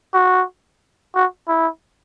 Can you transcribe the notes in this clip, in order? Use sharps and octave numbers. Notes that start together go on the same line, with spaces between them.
F#4
F#4
E4